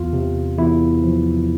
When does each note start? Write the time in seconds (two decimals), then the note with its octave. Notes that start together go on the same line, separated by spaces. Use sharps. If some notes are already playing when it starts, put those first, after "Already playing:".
Already playing: E2 F4
0.13 C3
0.58 E2 E4
1.04 F3